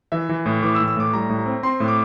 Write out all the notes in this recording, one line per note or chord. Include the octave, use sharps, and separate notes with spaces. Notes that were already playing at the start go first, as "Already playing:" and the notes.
E3 E5
E3
A2
E3 D6
E6
A2
E6
A2 D6
G3 A#5
A2
A#5
C4
C4 C6
A2
D6